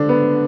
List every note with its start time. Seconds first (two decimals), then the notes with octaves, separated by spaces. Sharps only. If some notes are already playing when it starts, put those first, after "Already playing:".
Already playing: D3 D4
0.09 B3